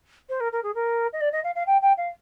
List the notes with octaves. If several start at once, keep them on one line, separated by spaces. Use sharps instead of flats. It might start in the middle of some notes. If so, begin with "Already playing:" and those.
C5
A#4
A#4
G#4
A#4
D#5
D5
D#5
F5
F5
G5
G5
F5